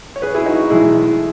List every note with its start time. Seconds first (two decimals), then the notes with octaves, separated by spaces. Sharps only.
0.16 C#5
0.22 G#4 B4
0.35 E4 G#4
0.46 D#4 F#4
0.70 B1 A2 E3 G#3 E4 G#4